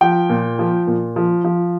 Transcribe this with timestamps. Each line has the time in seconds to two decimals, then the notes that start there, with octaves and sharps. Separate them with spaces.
0.01 F3 G5
0.30 A#2
0.59 F3
0.87 A#2
1.16 F3
1.44 F3